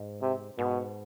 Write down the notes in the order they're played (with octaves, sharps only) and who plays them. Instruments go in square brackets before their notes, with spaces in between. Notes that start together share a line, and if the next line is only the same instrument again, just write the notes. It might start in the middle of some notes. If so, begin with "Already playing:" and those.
Already playing: [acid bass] G#2
[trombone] C3
[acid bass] G#2 [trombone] B2